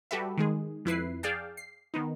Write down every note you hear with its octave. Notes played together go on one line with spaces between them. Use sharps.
G3 F#4 G4 A4 B4 E5
D#3 G#3 G#4
F2 E4 B4 C7
G#4 D5 F5 G5 A5
C7
D#3 B3 D#4